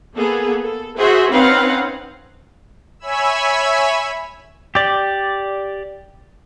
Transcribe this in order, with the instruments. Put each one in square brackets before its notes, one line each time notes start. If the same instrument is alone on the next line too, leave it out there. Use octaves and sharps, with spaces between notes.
[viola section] A#3 B3 G#4 A4
A4
F#4 G#4 C5 E5
C4 C#4 D#4 B4 F5 F#5
[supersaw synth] C#5 E5 G#5 B5 E6
[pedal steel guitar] G4 D5